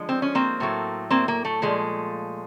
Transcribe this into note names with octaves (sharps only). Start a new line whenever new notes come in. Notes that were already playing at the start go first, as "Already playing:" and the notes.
Already playing: D3 F3 G#3
C4
C#4
A#3 C4
A2 F#3 A3
A#3 C4
A#3
A3
A#2 F3 G#3